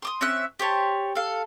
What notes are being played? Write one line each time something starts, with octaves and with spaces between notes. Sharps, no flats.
C6 D6 D#6
C4 C#4 E5 F#6
G4 C5 C#5 A5
A4 F5